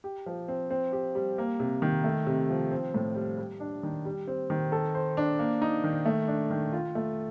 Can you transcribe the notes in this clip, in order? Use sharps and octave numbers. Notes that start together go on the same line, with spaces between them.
G4
F3
C4
C4
G4
G3
A#3
C3
D#3
A3
C3
F3
C4
A2
G3
G3
D4
D#3
G3
C4
D#3
A4
C5
D4
A#3
D#4
D#3
A3
D4
D#3
F4
A3